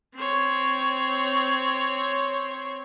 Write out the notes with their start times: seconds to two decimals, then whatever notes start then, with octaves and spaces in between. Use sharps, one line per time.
0.15 C4 C#5